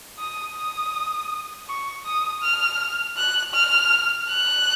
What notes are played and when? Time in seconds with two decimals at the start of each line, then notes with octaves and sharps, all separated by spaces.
0.18 D#6
0.56 D#6
1.67 C#6
2.05 D#6
2.42 F6
3.17 F#6
3.54 F6
4.29 F#6